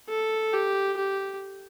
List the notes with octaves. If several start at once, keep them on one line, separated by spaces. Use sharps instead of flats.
A4
G4
G4